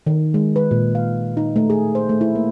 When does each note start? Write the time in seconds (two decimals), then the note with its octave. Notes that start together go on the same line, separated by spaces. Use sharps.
0.06 D#3
0.34 G#3
0.56 B4
0.71 A#2
0.95 F5
1.37 D#4
1.56 A3
1.70 G#4
1.95 C5
2.09 A3
2.21 E4
2.35 A#3